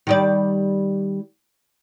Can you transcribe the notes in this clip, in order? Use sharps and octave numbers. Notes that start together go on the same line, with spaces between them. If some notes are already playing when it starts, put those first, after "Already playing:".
D#3 G3 D5